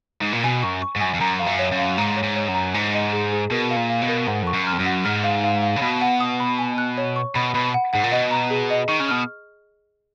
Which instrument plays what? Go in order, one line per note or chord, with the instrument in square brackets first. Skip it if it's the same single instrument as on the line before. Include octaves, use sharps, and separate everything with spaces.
[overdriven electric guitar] G#2
A#2
[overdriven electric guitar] B2 [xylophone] G#5
[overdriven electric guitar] F#2 [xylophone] C#6
[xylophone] C#6
[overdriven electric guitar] G#2
[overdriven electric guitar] F#2 [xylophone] G#5
[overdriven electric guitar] F2
[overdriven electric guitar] F#2 [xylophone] A#5
[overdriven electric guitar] F2 [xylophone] F5
[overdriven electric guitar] F#2
[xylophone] C#5
[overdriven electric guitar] F#2
[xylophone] F5
[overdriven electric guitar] G#2 [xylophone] A#5
[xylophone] C#5
[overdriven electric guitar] G#2
[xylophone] C#5
[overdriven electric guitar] F#2
[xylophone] A#5
[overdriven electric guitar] G#2 [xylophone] G#5
[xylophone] D#5
G#4
G#4
[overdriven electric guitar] B2 [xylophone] A#4
[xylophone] F5
[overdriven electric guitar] A#2
[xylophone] F5
[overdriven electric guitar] B2
[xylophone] A#4
[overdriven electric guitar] G#2 [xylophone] F#5
[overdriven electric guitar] F2 [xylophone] C#6
[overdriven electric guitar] F#2
[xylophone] F6
[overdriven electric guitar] F2
F#2
[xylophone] F#5
[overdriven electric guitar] G#2 [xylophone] F6
[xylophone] F5
F5
F5
[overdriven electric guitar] C#3
[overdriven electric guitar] B2 [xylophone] B5
[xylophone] F#5
D#6
B5
G#5
F#6
C#5
C#6
[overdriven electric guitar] B2 [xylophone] B5
[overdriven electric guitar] B2 [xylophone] B5
[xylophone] F#5
[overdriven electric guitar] G#2 [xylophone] F#5
[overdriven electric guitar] A#2
[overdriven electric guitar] B2 [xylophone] D#5
[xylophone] A#5
G#4
D#5
[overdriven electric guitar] D#3 [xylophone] C#6
[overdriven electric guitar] C#3
[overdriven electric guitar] B2 [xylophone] F6